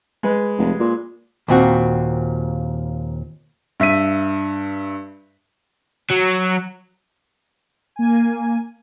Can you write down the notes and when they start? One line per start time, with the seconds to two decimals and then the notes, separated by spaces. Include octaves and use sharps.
0.23 G#3 B4
0.58 F1
0.80 A#2
1.48 D#2 A#2 C4 F#4
3.80 G2 E5 B6 D#7
6.11 F#3
7.96 A#3 G#5